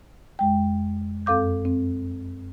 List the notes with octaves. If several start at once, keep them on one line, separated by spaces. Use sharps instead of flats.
F2 G#3 G5
F#2 C4 A4 F5 D6 G6
C4